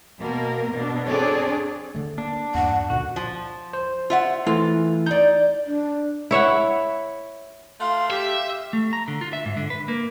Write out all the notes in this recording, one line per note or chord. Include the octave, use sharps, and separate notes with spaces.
B2 A#3 A#4
B2 D4
C4 D4 G#4 A4 C#5 D5
D3 A3
A#3 D4
E2 G2 F#5
C#2 A#2 D3 F#4
F3
C5
F4 E5 F#5
E3 A3 F4
D#4 D5 G6
D4
E4 C#5 E5 F#5
A3 F4 F5 C6
G4 E5
A3
A#5
D3
F4
E5
G#2
D3
B4
A#3